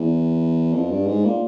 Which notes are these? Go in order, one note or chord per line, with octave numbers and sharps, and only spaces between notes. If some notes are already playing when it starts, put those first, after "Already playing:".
Already playing: E2
F2
G2
G#2
A#2